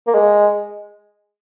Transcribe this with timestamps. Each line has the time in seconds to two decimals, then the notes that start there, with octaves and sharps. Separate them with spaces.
0.07 A#3
0.14 G#3